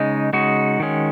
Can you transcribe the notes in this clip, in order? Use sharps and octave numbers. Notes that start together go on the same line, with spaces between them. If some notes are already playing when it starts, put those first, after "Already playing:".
Already playing: C#3 G#3 D#4
C#3 G#3 D#4 F#4
D#3 G#3 C#4